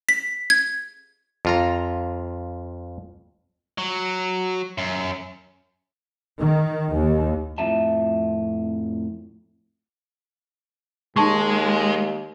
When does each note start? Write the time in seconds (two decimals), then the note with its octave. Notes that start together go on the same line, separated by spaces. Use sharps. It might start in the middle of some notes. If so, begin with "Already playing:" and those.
0.09 B6
0.50 G#6
1.45 F2 F4 A#5
3.78 F#3
4.78 F#2
6.38 D#3
6.92 D#2
7.58 F2 A2 C4 F4 E5 A5
11.16 D#2 G#3 D#4 A5 C#6